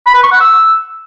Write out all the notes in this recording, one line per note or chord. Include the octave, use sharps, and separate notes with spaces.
B5
B4
C#6
F#5
E6